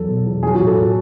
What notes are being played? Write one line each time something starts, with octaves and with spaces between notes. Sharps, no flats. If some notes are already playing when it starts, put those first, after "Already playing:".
Already playing: E2 F#3 A4
B2
E2
F#3 G#4
F#4
A2
A4
A2